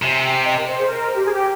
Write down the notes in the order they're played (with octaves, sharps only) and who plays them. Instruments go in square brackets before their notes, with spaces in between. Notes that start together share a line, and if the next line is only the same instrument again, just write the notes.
[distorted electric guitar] C3 [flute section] G#5
[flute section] G5
D#5
A#4
C5
G#4
A#4
G4
G#4
G4